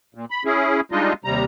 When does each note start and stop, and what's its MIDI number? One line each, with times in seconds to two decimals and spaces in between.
0.15 0.25 46
0.31 0.43 83
0.45 0.81 61
0.45 0.81 64
0.45 0.81 68
0.92 1.13 55
0.92 1.13 56
0.92 1.13 62
0.92 1.13 63
0.92 1.13 65
0.92 1.13 75
1.25 1.45 39
1.25 1.45 48
1.25 1.45 55
1.25 1.45 82